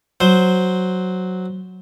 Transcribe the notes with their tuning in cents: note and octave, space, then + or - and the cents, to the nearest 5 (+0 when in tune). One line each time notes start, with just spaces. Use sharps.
F#3 +0 C5 +0